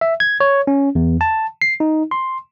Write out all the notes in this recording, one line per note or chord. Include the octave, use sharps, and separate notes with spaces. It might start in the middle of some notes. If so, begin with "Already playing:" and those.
E5
G#6
C#5
C#4
E2
A5
C7
D#4
C6